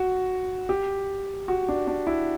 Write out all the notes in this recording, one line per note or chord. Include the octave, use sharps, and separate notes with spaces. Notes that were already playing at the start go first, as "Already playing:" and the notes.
Already playing: F#4
G4
F#4
D4
D4
E4